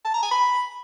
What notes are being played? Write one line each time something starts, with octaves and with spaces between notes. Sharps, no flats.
A5
A#5
G#5
B5